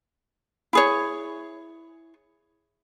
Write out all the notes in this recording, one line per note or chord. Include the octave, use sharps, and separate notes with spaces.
E4 G#4 C#5